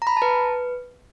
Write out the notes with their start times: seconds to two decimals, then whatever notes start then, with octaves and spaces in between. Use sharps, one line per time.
0.02 A#5
0.07 B5
0.12 A#5
0.17 A5
0.22 B4